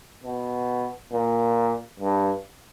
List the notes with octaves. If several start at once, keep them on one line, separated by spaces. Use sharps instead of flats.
B2
A#2
G2